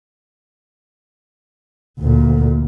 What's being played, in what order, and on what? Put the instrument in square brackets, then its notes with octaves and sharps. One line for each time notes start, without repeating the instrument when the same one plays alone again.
[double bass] D2 A#2